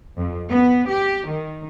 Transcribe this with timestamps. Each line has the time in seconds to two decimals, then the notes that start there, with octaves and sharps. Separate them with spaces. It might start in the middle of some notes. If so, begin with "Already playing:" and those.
0.18 F2
0.49 B3
0.89 G4
1.29 D#3